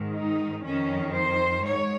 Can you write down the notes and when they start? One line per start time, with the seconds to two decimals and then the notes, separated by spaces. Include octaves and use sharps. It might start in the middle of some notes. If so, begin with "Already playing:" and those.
Already playing: G#2 D#3
0.14 D#4
0.64 F2 D#3 C#4
1.15 C5
1.66 G#2 C#5